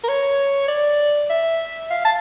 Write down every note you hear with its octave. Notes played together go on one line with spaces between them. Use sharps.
A#4
C#5
D5
E5
F5
A5